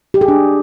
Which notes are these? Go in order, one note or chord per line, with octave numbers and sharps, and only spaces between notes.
G4
G#4
D4